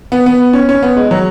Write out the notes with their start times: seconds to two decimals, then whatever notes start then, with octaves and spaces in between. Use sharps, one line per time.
0.12 B3
0.26 B3
0.53 C#4
0.69 C#4
0.82 B3
0.97 G#3
1.11 F#3